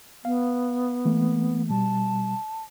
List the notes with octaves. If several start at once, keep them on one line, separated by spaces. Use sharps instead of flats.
B3 F5
E3 A3 A#3
B2 G3 A5